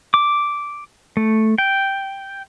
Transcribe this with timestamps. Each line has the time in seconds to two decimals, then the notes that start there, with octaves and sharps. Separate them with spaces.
0.14 D6
1.17 A3
1.58 G5